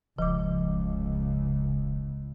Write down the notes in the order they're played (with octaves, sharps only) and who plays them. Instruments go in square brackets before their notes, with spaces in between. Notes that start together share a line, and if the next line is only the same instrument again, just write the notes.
[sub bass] D#1 [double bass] C#2 C#3 [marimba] F3 D6